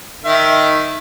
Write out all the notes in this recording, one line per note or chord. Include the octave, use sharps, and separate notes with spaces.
D#3 E5